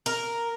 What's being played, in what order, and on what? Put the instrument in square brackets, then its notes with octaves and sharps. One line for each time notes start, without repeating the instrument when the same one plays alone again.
[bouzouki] A#4